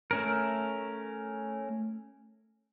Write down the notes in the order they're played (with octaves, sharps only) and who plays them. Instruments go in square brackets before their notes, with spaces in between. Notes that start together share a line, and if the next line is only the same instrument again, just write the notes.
[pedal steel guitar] A3 C#4 A#4